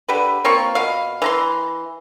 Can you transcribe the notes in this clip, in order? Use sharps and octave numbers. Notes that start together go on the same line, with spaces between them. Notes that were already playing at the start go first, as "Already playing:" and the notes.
D3 G4 B4
A#3 C4 F4 C#6
B2 F5
E3 A#5 C6